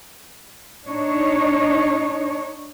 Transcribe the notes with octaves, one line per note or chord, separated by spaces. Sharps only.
D4 D#4 C#5